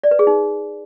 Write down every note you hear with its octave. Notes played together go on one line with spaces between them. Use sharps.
D5
B4
G#4
D#4